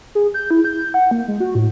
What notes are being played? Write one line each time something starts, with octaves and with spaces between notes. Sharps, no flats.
G#4
G6
E4
G6
F#5
A#3
G#3
F#4
A2